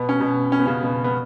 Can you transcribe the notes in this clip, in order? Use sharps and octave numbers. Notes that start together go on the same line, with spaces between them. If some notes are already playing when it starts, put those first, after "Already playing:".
Already playing: B2 B3
C#4
B2 B3
C#4
B3
C#3 C#4
B2 B3
B3